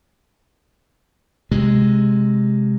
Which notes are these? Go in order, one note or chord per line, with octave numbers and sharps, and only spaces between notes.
C3 G#3